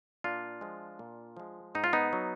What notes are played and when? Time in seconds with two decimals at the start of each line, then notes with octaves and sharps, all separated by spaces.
0.24 A#2 D4 F4
0.61 F3 G#3
0.99 A#2
1.37 F3 G#3
1.75 G#2 D#4
1.84 F4
1.93 B3 D#4
2.13 F#3